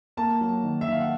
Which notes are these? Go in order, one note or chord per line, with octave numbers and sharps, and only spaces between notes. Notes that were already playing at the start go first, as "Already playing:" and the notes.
A#3 A5
F#3
D#3
E5
D#3 F5
F#5